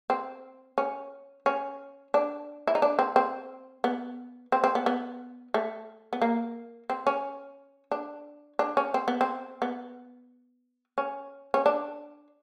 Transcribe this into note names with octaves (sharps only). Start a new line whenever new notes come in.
C4
C#4
C#4
D4
E4
D#4
D4
C4
C4
B3
C4
C4
B3
B3
A3
B3
A#3
C4
C#4
D4
D4
C#4
C4
B3
C4
B3
C#4
C#4
D4